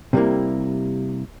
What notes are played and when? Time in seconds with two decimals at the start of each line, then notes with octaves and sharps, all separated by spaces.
0.13 C3 G3 A#3 E4